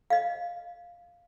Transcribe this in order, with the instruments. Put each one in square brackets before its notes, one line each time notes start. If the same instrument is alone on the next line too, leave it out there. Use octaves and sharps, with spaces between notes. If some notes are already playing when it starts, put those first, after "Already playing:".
[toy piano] D#5 F5